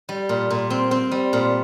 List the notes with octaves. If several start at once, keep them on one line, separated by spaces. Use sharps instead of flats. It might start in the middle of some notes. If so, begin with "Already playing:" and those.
G3
A#2
A#2
C4
C4
G3
A#2